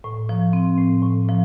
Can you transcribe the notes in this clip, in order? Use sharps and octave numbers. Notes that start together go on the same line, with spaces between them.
A2
F3
C4
A2
A2
F3